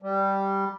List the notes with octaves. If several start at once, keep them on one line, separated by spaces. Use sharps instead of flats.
G3